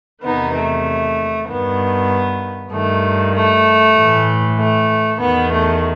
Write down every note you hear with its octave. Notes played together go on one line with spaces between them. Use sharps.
E2 C3 D#3 B3 D#4
A3
G2 D#3 B3
G2 D#3 A3
A3
A2 E3
A3
E2 D#3 B3
A3